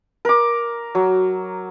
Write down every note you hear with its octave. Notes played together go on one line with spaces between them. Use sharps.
A#4 D6
F#3